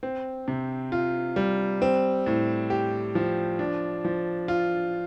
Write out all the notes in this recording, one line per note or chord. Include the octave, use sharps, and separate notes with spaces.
C4
C3
F4
G3
C4
A2
G4
F3
D4
F3
F4